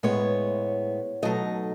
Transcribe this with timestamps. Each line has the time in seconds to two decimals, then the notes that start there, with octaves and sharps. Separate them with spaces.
0.03 A2 G#3 B3 C#5
1.22 B2 F#3 A3 D#4 D#5